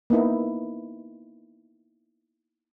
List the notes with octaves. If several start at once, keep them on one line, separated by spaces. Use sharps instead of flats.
A#3 B3 D#4 E4